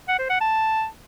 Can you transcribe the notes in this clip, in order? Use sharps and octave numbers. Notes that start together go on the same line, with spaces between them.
F#5
C5
F#5
A5